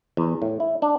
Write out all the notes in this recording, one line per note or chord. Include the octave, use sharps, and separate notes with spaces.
E2
A2
E4
D4